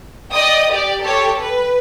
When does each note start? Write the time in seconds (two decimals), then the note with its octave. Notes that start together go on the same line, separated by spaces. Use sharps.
0.32 D5 D#5 G5 D#6
0.71 G4 D5
1.00 G4 A4 C#5
1.39 B4